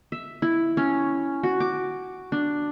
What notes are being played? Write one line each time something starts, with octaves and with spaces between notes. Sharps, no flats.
E5
E4
C#4
F#4
D6
D4